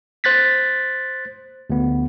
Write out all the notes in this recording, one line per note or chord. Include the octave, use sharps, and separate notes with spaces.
C5 F#6 A6 B6
D2 B3